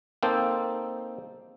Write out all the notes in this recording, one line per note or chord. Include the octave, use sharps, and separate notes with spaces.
A#3 C4 D#4 A4 C5